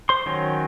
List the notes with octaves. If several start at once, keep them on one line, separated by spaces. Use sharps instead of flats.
C5 C6
D#3 F#3 C#4